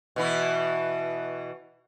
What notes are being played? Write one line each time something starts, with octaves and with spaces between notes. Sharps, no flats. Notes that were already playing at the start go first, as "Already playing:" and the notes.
B2 E3 E4